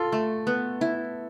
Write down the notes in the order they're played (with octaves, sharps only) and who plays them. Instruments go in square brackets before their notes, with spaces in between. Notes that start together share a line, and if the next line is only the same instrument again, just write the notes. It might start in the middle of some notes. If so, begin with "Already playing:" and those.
Already playing: [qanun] F4 [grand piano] A4
[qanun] A3
B3
E4